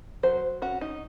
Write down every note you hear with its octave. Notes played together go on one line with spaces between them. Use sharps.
F#3 C5
C#4 F#4
D#4